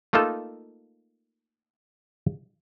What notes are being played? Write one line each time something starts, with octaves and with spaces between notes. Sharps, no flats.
A3 A#3 D#4 F4 A4